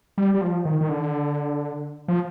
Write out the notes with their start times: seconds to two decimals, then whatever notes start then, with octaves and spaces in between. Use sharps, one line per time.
0.18 G3
0.34 G3
0.41 F3
0.65 D#3
0.81 D#3
0.89 D3
2.08 F3